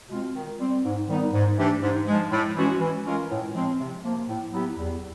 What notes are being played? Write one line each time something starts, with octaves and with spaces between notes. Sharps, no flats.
B2 G#3 C4 F4
D#3
G3 C4
G#2
D#3 G3 B3 D#4
G#2
E3 A3 D4 G4
G#2
F3 G#3
A2
E3 G#3 C#4 F#4
E3
G#3 C#4 F4 A#4
A2
F3 G#3 C4
C3
F3 A#3
A2
F#3 B3 E4 G4
E2